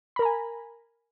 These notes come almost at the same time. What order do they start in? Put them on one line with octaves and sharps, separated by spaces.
B5 A#4 A#5 G#5